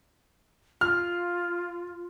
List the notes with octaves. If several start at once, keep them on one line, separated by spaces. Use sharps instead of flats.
F4 F6